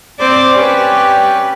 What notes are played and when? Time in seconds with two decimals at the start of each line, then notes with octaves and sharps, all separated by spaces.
0.19 C4 C5 D5 D6
0.54 C#4 G4 B4 D5